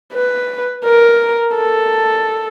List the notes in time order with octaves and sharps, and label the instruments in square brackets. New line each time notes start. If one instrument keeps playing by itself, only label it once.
[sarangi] B4
A#4
A4